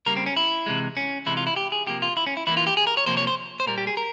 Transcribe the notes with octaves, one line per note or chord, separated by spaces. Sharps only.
C#3 G3 A#3 A#4
C4
C#4
E4
C3 E3 G#3
C#4
C3 E3 G#3 E4
F4
E4
G4
G#4
C3 F3 A#3 G4
F4
E4
C#4
E4
E3 G3 A#3 E4
F4
G4
G#4
A#4
C#5
C3 F3 A#3 C5
C#5
C5
C5
A#2 G3 A#3 A#4
G4
G#4
A#4